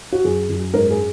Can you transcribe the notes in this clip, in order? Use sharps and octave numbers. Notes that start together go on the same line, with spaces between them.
F#4
F#2 G#4
F#2
G#2 A#4
G#4